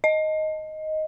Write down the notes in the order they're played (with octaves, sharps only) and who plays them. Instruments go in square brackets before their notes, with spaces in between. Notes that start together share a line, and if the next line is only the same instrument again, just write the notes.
[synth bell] D#5